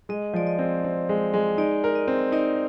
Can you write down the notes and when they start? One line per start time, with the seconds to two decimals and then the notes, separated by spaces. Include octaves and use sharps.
0.09 G#3 D#5
0.33 F3 D5
0.47 D#5
0.59 C4
0.84 C4
1.09 G#3
1.34 G#3
1.58 D#4 D5
1.84 A#4
1.95 D#5
2.08 C4
2.32 D#4 D5